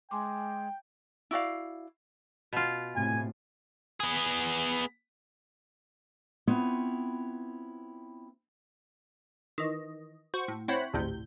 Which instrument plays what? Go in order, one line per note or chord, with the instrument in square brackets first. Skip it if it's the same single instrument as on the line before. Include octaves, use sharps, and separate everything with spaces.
[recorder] G#3 [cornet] G5 [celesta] G#5 C6 D6
[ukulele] E4 F#4 D5 F5
[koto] B2 F4
[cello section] A2 C3 [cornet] G#5
[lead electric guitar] B3 G#4
[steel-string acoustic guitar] B3 C4 E4 F4 B4 C#5
[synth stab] D#3 E3 D#5
F#4 C5 C#6
A2
C4 E4 C5 C#5 F#5 B5
G#1 D2 A2 C3 G6